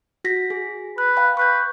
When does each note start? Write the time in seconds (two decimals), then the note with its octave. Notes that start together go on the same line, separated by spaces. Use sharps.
0.24 F#4 A#6 B6
0.50 G#4
0.98 B4 F#6
1.17 F5 G5 B5
1.37 B4 C#6 F#6 G6